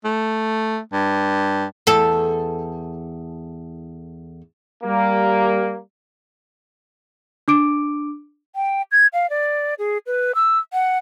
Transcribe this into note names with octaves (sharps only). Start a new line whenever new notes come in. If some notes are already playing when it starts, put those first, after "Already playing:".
A3
G2
E2 A4
G3 A#3
D4 D6 D7
G5
G#6
F5
D5
G#4
B4
E6
F#5